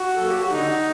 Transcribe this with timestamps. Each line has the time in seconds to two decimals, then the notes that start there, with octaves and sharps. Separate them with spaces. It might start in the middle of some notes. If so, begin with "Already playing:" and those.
Already playing: F#4
0.16 F#3 A#3 A4
0.29 G4
0.40 F#4
0.51 D3 D#4